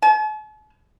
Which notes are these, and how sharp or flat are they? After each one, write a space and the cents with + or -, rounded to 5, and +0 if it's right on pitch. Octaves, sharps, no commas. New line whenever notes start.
A5 -45